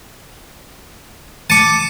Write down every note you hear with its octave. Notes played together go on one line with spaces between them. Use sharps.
A5 D6 C#7 D#7